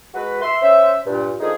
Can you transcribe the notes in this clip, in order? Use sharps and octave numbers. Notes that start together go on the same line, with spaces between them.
G#3 F#4 B4
E5 C6
C#4 C5 E5
G2 A#2
D3 F3 A#3 D#4 G#4